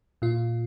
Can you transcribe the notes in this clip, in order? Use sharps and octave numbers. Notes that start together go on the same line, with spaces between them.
A#2 F4